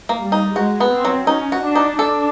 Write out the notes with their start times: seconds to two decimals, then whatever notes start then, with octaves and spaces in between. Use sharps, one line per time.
0.09 A#3
0.21 G3
0.32 D#4
0.56 G#3 F#4
0.80 B3
0.92 C4
1.05 F#3
1.27 C#4 D#4
1.52 F#4
1.63 D4
1.75 D#4
1.99 D4 A4